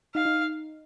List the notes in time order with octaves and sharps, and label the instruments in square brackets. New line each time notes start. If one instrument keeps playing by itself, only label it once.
[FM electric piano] D#4 [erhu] F5
[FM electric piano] D#4